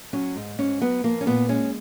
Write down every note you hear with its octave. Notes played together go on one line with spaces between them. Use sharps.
F#3 C#4
G#2
G#2 C#4
F#3 B3
F3 A#3
C#4
A#2 B3
G#3 C#4